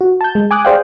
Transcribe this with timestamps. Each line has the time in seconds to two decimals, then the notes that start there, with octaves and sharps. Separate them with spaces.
0.01 F#4
0.21 A5 G6
0.35 G#3
0.51 G#5 D6 D#6 F#6
0.65 G#4 C5 D5 F5 G5